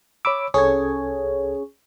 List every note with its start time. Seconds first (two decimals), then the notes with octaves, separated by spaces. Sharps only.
0.25 C#5 B5 D6 E6
0.54 C2 C#4 G#4 A4 C#5 G#6